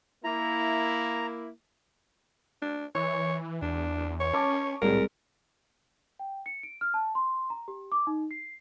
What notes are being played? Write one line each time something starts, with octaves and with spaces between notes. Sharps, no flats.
A#3 E4 A#5
D4
E3 C#5
E2 D4
C#5
C#4 A5 C#6 D6
C2 A2 G#3 A#4
G5
C#7
D7
F6
A5
C6
A#5
G4
D6
D#4
C7